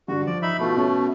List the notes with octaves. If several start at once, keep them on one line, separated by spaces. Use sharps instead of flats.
G2 D3 F#4
F3 D5
D#4 E5 B5
B2 A3 E4 F4
B3 C#4 A4